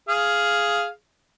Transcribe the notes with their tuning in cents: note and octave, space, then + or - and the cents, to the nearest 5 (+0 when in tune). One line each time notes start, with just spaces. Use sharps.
G#4 +5 F5 +0